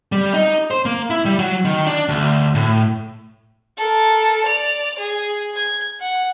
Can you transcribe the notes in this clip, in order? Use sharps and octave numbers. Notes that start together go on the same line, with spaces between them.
G3
D#4
C5
A#3
E4
G3
F#3
D#3
D4
D2
A2
A4 A#4
D5 F7
G#4
G#6
F#5